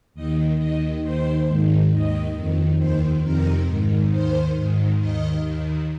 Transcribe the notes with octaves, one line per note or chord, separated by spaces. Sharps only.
D#2 D#3 D#5
D#2 D#3 D#5
D#2 D#3 C5
G#2 D#3
D#2 D#3 D#5
F2 D#3
D#2 D#3 C5
F2 C3 D#3 A#4
G#2 D#3
D#2 D#3 C5
G#2 D#3
D#2 D#3 D#5
D#2 D#3